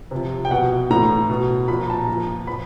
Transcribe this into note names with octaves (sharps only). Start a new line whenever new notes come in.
C3 F3
G5
B2 F#5
A2 E3 A#5
B2
A#2 F3 B5
A#5
A5
A#5
A#2 F3
F3 B5